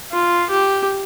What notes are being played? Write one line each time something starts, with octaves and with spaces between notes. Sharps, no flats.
F4
G4